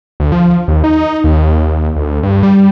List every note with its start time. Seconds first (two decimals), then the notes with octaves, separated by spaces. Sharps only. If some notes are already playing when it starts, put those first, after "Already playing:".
0.20 D2
0.32 F3
0.68 D#2
0.84 D#4
1.24 D#2
1.96 D2
2.23 G2
2.43 G3